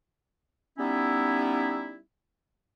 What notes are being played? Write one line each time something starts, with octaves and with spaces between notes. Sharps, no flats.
G3 B3 C#4 D#4 E4